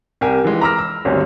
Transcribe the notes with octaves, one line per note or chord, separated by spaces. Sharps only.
C2 G4 A#4 G#5
E3 F3 G#3
A#5 B5 D6 E6 F6 A#6
E6
G#1 D2 G2 C#4